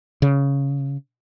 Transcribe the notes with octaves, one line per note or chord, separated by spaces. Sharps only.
C#3